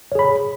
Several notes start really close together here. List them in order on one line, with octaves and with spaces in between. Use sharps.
C#5 G#4 B5